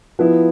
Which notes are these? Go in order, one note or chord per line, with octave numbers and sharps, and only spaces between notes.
F3 B3 E4